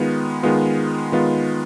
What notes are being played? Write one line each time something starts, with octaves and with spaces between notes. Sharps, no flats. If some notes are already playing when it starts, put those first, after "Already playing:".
Already playing: D#3 G#3 B3 F4
D#3 G#3 B3 F4
D#3 G#3 B3 F4